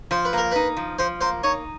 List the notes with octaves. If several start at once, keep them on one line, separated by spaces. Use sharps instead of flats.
F3 C5
B4
A#3 A#4
D#4 B4
F3
F3 C5
A#3 C5
D#4 C#5